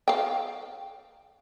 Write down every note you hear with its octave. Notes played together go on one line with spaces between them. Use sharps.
F5 G5